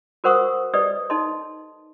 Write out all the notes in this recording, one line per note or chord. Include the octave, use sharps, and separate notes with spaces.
F#4 A#4 C5 F#5 C#6 D#6
G4 B4 D5 D#5 D#6
D#4 A4 D#5 C6